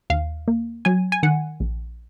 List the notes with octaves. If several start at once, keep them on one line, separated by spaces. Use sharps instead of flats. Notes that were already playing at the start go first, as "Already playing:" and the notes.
D#2 F5
A#3
F#3 G#5
G#5
D#3 F#5
A#1